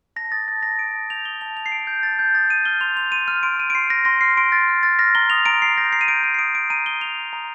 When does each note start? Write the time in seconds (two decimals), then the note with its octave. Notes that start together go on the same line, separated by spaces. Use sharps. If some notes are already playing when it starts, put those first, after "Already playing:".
0.16 A5 A#6
0.32 D#6 A6
0.47 A5 A6
0.63 A5 A#6
0.78 D#6 D7
0.94 A5
1.10 G6 F7
1.25 D#6 G7
1.41 A5 F7
1.56 A5 F7
1.66 C7
1.72 A5 D7
1.87 G6
2.03 A5 A6
2.19 G6
2.34 D#6 A6
2.50 D#6 D#7
2.65 F6 G7
2.81 C6 F7
2.97 C6 F7
3.12 C6 D#7
3.28 F6 D#7
3.43 C6 D7
3.59 C6 D#7
3.70 D7
3.75 C6 C7
3.90 F6 A#6
4.05 C6 A#6
4.21 F6 C7
4.37 C6 D7
4.52 F6 A6
4.68 F6
4.83 F6 A6
4.99 F6 A#6
5.15 A#5 G7
5.30 D#6 F7
5.46 A#5 D7
5.62 A#5 C7
5.78 G6 A#6
5.92 A#5 C7
6.01 D#7
6.08 G6 D7
6.23 A#5 D#7
6.34 C7
6.39 D#6 D7
6.55 A#5 D7
6.70 A#5 D#7
6.86 D#6 G7
7.01 D#6 F7
7.17 D#6
7.33 A#5